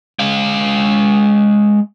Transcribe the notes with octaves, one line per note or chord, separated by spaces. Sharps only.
G#3 F5